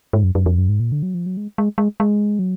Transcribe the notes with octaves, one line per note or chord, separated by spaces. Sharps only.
G#2
F#2
F#2
F2
F#2
G#2
A#2
D3
F#3
F3
F#3
G#3
G#3
G#3
G#3
F#3